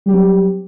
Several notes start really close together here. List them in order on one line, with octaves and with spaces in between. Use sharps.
G3 G4 F#3 C4